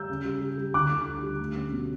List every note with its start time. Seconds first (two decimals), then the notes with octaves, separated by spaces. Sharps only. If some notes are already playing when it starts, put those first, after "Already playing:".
Already playing: G3 E6 G6
0.10 C#3
0.25 G3
0.41 G3
0.58 G3
0.74 D2 D6 F#6
0.91 D3
1.07 D2
1.23 G3
1.40 A3
1.56 C#4
1.72 B2